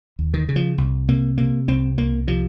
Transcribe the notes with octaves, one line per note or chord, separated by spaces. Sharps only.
D#2
D#3
C#3
F3
C2
C3 A#3
C3 A#3
C2 C4
C2 A#3
C3 F3